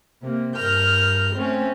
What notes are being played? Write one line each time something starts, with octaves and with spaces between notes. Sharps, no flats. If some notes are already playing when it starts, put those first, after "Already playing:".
C3 A#3
G2 A#4 F6 G6
A3 C4 C#4